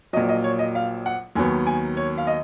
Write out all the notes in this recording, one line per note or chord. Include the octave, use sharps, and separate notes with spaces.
A#1 A#2 F#3 D#5
D#5
C#5
D#5
F5
F#5
D#2 D#3 F#3 B3 G#5
G#5
C#5
F5
D#5